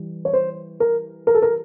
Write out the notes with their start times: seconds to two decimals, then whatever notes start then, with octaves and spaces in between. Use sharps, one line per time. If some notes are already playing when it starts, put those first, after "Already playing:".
Already playing: E3 G3
0.25 C#5
0.33 C5
0.80 A#4
1.27 A#4
1.34 A4
1.42 A#4